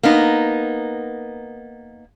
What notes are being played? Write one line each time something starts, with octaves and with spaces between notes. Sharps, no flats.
A#3 B3 D#4